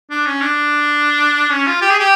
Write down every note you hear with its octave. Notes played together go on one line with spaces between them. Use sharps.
D4
C#4
D4
C#4
F4
G4
G#4
G4